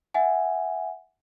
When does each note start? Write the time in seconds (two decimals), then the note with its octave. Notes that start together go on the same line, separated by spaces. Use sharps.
0.14 E5 F#5 G#5